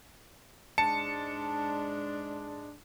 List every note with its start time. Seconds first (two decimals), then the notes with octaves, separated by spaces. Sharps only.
0.78 G#2 G#3 D4 A5 C#7